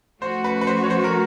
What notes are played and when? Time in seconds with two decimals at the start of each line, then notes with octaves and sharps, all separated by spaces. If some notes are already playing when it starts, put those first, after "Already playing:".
0.21 F3 A3 C#4 F#4 C5
0.44 B4
0.61 B4
0.67 C5
0.83 C#5
0.90 C5
1.04 A#4